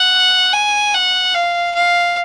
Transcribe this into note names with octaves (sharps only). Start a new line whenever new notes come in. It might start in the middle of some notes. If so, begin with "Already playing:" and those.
Already playing: F#5
G#5
F#5
F5
F5